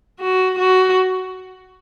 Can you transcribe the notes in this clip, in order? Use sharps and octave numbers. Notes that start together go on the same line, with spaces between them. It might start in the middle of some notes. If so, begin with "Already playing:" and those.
F#4
F#4